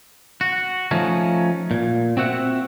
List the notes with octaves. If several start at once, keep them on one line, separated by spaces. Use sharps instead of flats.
F#4
F3 A3 C#4 D#4
A#2
C4 F#4 E5 F#5